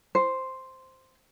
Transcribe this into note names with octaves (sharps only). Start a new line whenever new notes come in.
C5